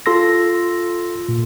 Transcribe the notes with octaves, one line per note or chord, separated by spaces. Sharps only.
F4 A4 C6 E6 A#6
A#2